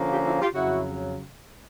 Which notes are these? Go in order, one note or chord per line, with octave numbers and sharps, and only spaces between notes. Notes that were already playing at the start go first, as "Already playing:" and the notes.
Already playing: D3 F3 A#3 C#4
F4 G4
E4 F#4
F4 G4
F2 C#3 F#3 E4 F#4